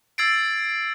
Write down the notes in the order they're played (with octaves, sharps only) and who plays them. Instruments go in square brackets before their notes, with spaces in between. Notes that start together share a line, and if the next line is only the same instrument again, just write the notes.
[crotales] E6 G#6 A6 C7 D7